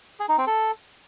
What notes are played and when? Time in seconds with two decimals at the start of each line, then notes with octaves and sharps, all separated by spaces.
0.20 G#4
0.29 D#4
0.38 C4
0.47 A4